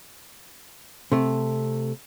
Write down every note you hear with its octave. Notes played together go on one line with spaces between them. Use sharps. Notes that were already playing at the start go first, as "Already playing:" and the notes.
C3 A3